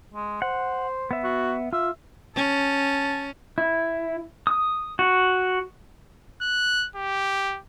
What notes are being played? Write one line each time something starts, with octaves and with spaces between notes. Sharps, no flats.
G#3
C5 F#5
B3 E5
F#4
F4 E5
C#4 A5
E4
D#6
F#4
F#6
G4